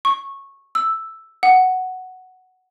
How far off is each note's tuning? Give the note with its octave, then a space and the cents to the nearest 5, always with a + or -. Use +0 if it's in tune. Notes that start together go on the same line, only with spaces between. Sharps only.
C#6 -15
E6 +0
F#5 +5